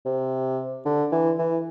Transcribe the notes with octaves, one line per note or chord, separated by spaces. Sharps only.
C3
D3
E3
E3